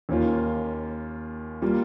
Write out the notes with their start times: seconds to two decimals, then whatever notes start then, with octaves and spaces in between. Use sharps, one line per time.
0.09 D#2 D#3 A#3 C#4 F4
1.62 G3 A#3 F4